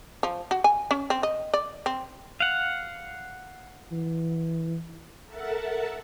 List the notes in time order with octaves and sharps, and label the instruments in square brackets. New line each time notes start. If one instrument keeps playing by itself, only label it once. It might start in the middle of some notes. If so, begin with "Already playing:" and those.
[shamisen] F3
F#4
G#5
C#4
C4
D#5
D5
C4
[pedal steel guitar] F5 F#5
[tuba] E3
[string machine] A4 A#4 E5 F#5 A5